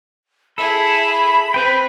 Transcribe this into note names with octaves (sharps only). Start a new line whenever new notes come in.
E4 G#4 A4 B5
C4 B4 G5